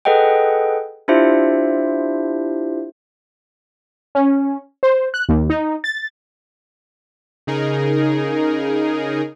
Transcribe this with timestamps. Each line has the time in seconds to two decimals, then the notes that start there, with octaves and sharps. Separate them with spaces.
0.05 G#4 A4 B4 D#5 F#5 G5
1.08 D4 E4 F4 G4 C5 E5
4.15 C#4
4.83 C5
5.14 F#6
5.29 D#2
5.50 D#4
5.84 A6
7.47 C#3 D#4 G#4 A#4